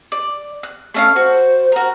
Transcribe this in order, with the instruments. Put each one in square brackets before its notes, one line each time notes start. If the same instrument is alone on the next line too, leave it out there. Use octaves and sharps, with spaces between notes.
[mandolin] D5
F#6
A3 C#4 F5
[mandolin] F#4 [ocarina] C5
[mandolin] F#4 A#4